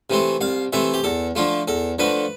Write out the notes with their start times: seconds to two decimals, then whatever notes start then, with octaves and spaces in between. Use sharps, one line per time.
0.10 C3 E3 A3 C4
0.41 C2 F5
0.73 C3 E3 A3 C4 E5
0.94 G4
1.04 E2 A4
1.36 D3 F3 A3 F4
1.68 E2 A4
1.99 D3 F3 A3 B4